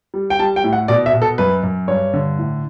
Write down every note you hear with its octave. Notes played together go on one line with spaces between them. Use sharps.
G3
G5
G3 A5
G5
A2
F#5
B2 D5
E5
B2
A4
F#2 B4
F#2
G2 C#5
D3
A2